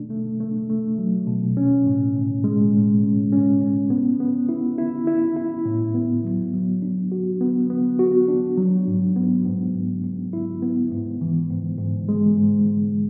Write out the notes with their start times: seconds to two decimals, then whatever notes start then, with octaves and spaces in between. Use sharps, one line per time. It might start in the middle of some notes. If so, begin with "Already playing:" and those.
Already playing: B2 A3 D4
0.10 A3
0.40 A3
0.70 A3
0.98 F#3
1.27 B2
1.57 C#4
1.86 A2
2.15 A2
2.44 G#3
2.74 A2
3.03 C#4
3.33 C#4
3.61 C#4
3.90 B3
4.20 B3
4.49 E4
4.78 E4
5.07 E4
5.36 E4
5.65 A2
5.95 B3
6.24 F#3
6.54 F#3
6.82 D4
7.12 F#4
7.41 B3
7.70 B3
7.99 F#4
8.29 D4
8.58 F#3
8.87 G#2
9.16 B3
9.45 G#2
9.75 G#2
10.04 G#2
10.33 E4
10.62 B3
10.92 G#2
11.21 E3
11.50 G#2
11.79 G#2
12.09 G#3
12.37 G#2
12.66 G#2